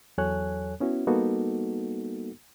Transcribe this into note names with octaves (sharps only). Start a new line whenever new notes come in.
E2 F#3 A4 C#5 G#5 F#6
B3 C#4 E4 F#4
G3 A#3 B3 D#4 F#4 A4